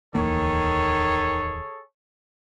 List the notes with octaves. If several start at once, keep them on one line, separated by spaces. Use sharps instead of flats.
D1 E2 D#3 A#3 G#4 A4 C#5